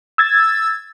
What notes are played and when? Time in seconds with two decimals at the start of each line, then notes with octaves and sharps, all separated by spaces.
0.18 E6 G#6 A6